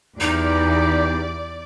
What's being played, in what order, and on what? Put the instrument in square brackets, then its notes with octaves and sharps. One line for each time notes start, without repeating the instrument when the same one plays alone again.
[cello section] E2 [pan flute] D#4 [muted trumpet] G4 [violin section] D5